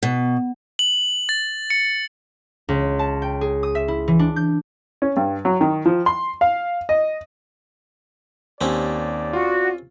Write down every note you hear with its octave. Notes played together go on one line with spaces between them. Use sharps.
B2
F#7
A6
C#7
C#2
A5
G5
G#4
D#6
E5
E4
E3
D4
G6
C#4
G2
F#3
D#3
F3
C6
F5
D#5
D#2 C4 C#4 G4 D5
F4 F#4